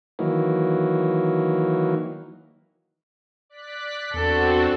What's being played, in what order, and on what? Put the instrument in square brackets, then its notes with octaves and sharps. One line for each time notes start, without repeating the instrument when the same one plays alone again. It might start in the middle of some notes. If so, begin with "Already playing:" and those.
[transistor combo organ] D#3 E3 F#3 A#3
[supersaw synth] D5 F#6 B6
[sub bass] E2 [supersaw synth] C4 D4 F#4 [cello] A4